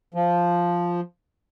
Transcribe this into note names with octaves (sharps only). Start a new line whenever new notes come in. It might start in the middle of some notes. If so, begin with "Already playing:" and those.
F3